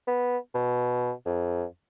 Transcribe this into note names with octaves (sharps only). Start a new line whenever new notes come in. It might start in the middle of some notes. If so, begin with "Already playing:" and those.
B3
B2
F2